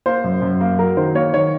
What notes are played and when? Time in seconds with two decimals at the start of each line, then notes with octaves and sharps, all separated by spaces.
0.06 A#3 C5
0.24 F#2
0.42 F#2
0.61 A#3
0.78 F#3 A#4
0.97 D#3 C5
1.15 A#3 C#5
1.33 D#3 C#5